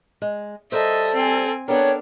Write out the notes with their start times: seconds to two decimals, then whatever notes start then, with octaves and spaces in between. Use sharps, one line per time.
0.22 G#3
0.72 G3 A4 A#4 C5 D#5 E5
1.14 C4 G#5
1.68 B3 D4 A4 A#4 C#5 G5